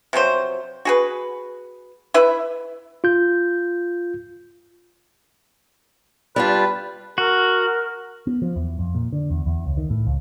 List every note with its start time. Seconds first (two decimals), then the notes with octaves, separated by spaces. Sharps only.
0.13 C3 F3 F#3 C5
0.85 F#4 G#4 B4
2.14 E4 B4 E5
3.04 F4 G6
6.36 G3 D4 F4 B4
7.18 F#4 A#4
8.27 B3
8.42 F3
8.56 E2
8.79 F2
8.95 A#2
9.12 D3
9.31 E2
9.46 E2
9.65 C#2
9.77 D#3
9.90 A2
10.07 C#2